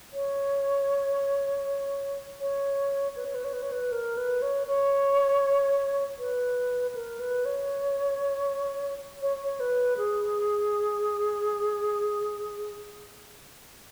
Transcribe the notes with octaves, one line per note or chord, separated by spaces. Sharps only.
C#5
C#5
B4
C#5
B4
C#5
B4
C#5
B4
A#4
B4
C#5
C#5
B4
A#4
B4
C#5
C#5
C#5
B4
G#4